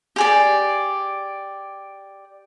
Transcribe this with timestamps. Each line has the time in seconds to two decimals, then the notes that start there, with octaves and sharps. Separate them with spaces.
0.16 G4 G#4 D5